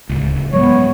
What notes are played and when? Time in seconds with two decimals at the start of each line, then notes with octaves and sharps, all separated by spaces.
0.09 D1 C#2
0.53 A2 F#3 G#3 B3 C#5